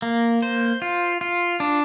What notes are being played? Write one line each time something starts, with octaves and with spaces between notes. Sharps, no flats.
A#3
C5
F4
F4
D4